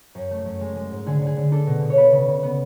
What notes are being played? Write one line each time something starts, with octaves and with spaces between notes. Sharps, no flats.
F#2
A3
F#2
G#3
G#3
G#2
D3 G#4
D3
G#4
D3
D4 A4
B2
B2
C#5
B3 B4
C#3
C#3
B3